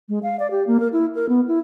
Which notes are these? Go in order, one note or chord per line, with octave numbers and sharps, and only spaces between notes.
G#3
F5
D5
G4
A#3
A#4
E4
A#4
B3
E4